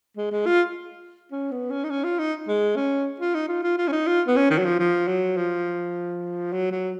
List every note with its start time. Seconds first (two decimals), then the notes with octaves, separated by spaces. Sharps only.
0.17 G#3
0.32 G#3
0.46 F4
1.32 C#4
1.52 B3
1.70 C#4
1.84 D#4
1.90 C#4
2.04 F4
2.19 D#4
2.48 G#3
2.76 C#4
3.20 F4
3.35 D#4
3.49 F4
3.63 F4
3.78 F4
3.88 C#4
3.93 D#4
4.07 F4
4.28 B3
4.36 C#4
4.51 D#3
4.58 F#3
4.65 F3
4.80 F3
5.08 F#3
5.37 F3
6.53 F#3
6.72 F#3